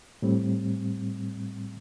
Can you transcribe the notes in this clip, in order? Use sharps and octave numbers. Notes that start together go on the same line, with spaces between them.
A2 G3 C4